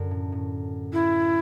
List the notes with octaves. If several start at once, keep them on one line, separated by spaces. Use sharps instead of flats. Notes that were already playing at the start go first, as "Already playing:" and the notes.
Already playing: F#2 D3
A2
A2
E4